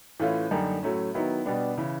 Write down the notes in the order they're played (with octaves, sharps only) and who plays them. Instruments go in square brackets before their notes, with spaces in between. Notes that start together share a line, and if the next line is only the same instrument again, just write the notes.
[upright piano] A2 E3 A3 C#4 F4
F#2 D3 G3 A#3 D#4
A2 F#3 A3 C#4
D#3 F#3 B3 E4
B2 G3 B3 D4
C#3 E3